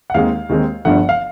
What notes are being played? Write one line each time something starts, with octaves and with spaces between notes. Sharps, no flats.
F#5
D#2 D#3 G#3 C4 F5
D#2 D#3 G#3 C4
G1 G2 D3 F3 A3 F#5
F5